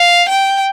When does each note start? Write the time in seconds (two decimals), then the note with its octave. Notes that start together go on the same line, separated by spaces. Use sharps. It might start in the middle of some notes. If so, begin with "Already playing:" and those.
Already playing: F5
0.29 G5